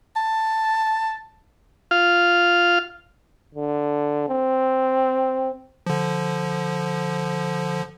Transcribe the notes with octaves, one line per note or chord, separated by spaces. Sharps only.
A5
F4 F5
D3
C4
D3 F3